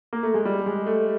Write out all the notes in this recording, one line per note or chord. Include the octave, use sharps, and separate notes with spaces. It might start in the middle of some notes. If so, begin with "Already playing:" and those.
A#3
A3
G#3
G3
G#3
A3